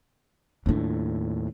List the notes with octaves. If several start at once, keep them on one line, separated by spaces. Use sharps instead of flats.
D#2 A2 D4 F4